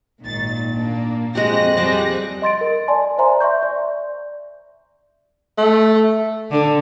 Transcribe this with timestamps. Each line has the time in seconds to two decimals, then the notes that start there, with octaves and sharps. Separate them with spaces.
0.23 G#1 A#2 D#3 A6
0.72 A#3 D4
1.35 F2 G#3 F#4 G4 F#6 A#6
1.77 G3 G4 G#4 C5 D5 A5
2.42 D#5 C6 A6 D7
2.61 A#4
2.88 D5 G#5 A5 C6
3.18 C5 D5 E5 G#5 A#5 C6
3.41 E5 C6 C#6 G6
3.63 D5
5.58 A3
6.51 D3